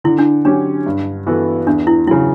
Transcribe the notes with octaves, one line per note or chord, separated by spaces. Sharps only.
D3 E4
D4
F#3 C#4 D4 G4
G2
E3 B3 F#4 A4
E2 D4
E4
C#3 F#3 E4